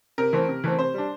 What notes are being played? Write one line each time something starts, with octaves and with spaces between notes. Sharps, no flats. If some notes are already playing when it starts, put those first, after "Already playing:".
C3 A#4
E3 A3 C4
C3
E3 A3 C4
C3 C5
G3 D4